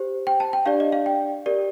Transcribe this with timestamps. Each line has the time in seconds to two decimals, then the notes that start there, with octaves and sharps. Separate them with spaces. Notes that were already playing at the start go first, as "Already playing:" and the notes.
Already playing: G4 C5
0.27 G5
0.40 A5
0.53 G5
0.66 D4 G4 D5 F5
0.80 D#5
0.92 F5
1.06 G5
1.46 G4 A#4 D5